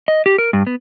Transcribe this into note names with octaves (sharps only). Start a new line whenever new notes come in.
D#5
G4
A#4
G2
B3